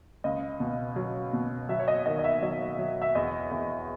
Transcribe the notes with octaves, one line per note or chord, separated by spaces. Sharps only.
C#2 D#5
B2
F#3
B2
F#3 E5
C#5
D#5
D#3 D#5
D#5
E5
F#3 D#5
F#3
E5
E2 D#5
E2